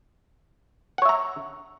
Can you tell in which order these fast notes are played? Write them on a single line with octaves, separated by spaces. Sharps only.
F#5 C#5 E5 A#5